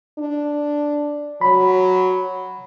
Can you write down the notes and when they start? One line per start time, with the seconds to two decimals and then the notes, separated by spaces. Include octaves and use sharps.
0.19 D4
1.41 F#3 B5